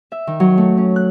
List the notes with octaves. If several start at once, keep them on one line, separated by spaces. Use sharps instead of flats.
E5
D#3
F#3
A3
C#4
F#6